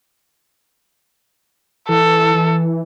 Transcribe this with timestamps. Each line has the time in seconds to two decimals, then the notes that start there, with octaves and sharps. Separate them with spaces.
1.89 E3 A4
2.34 E3